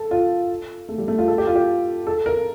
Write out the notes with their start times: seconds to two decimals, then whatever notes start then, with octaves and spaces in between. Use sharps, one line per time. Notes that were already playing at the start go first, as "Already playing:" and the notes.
Already playing: A4
0.11 F4
0.89 A3
0.98 G3
1.08 A3
1.18 F4
1.28 A4
1.38 G4
1.47 F4
1.56 G4
2.07 A4
2.26 A#4